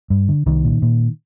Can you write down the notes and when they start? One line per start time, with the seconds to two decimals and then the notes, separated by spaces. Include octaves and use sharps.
0.10 G2
0.28 D3
0.46 C2 D#3
0.64 A#2
0.82 A#2